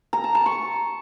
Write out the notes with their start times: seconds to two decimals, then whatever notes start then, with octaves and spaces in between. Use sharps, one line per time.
0.13 A#5
0.24 A5
0.35 A5
0.46 C#6